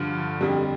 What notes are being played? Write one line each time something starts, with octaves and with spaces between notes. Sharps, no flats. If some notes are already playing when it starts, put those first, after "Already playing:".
Already playing: G2 D3 F3
F2 D3 G3